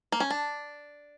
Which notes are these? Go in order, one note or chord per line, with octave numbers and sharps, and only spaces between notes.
A#3
C#4
D4